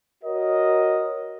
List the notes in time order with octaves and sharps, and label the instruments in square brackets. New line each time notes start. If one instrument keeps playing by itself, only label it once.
[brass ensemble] F#4 A#4 C#5 D#5